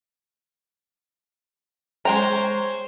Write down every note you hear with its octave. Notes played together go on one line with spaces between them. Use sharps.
G#3 C5 C#5 G5 A#5